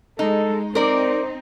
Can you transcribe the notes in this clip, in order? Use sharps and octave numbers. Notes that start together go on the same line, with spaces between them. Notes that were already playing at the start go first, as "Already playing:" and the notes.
G#3 D#4 A4
C4 D#4 A#4 C5 D5